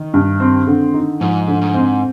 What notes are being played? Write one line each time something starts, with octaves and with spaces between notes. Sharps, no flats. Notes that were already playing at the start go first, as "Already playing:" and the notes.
Already playing: D#3
G2
C4
D3
D#4
G#2 F3
D3
G#2
C4